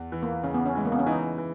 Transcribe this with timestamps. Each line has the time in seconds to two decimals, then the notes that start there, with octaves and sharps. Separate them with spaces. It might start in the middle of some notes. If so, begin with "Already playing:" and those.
Already playing: E2
0.12 E3
0.23 A#3
0.44 C#3 C#4
0.54 B3
0.66 C#4
0.75 E3 G#3
0.85 A#3
0.92 B3
0.99 C#4
1.06 E3 D#4
1.38 E3